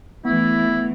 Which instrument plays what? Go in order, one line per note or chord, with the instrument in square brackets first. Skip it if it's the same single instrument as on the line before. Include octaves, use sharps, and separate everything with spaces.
[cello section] E3 A3 [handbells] B3 [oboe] E4